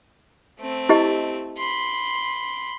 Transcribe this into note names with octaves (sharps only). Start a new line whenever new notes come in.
A3 C4
E4 G4 D#5
B5 C6